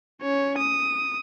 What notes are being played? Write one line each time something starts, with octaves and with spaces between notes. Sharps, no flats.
C#4 C#5
D#6